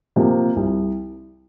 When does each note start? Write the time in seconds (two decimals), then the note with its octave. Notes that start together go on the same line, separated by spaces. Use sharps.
0.16 C3 F3 A#3
0.56 C2